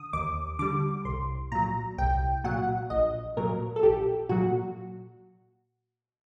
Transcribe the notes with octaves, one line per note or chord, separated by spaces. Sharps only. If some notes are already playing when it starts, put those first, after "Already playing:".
Already playing: D3 D#6
D#2 D6
D3 G3 D6
C2 C6
A#2 F#3 A#5
C2 G5
A#2 F#3 F#5
A#1 D#5
A#2 F#3 A#4
A4
A#1 G4
A#2 F#3 F#4